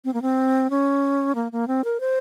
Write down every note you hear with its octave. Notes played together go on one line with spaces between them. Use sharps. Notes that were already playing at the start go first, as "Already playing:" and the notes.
C4
A#3
C4
C#4
A#3
A#3
C4
A#4
C5